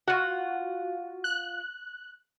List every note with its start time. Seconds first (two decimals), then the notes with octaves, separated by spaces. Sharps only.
0.08 F4 F#4 F#5
1.24 F#6